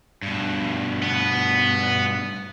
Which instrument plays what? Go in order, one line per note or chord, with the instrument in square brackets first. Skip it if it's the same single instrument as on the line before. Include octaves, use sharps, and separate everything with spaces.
[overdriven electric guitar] G2 B2
[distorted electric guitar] B3